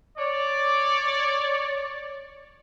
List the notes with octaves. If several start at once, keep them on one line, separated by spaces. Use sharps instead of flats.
C#5 D5